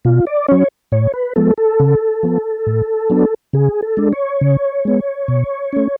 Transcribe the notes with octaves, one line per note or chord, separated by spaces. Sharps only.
B2 F4
D5
F#3 C#4 C#5
A2 C#5
B4
F3 G#3 B3 A4
A4
C#3
F3 B3
A2
F#3 B3 D4
C#3 G#4
A4
G#3 D4
C#5
C#3
G#3 B3
B2
A3 C#4